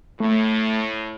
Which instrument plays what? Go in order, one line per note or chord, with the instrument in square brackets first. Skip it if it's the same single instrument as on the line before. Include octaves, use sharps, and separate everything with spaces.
[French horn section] A2 [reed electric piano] A3